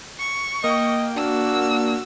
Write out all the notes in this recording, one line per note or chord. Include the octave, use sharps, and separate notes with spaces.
C#6
A#3 D#5 G5
D4 F#4 E6